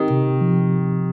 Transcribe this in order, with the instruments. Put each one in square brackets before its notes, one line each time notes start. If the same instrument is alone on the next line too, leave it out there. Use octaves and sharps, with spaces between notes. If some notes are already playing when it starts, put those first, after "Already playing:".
Already playing: [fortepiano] D#3 [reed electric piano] C4 G4
[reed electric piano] C3
F3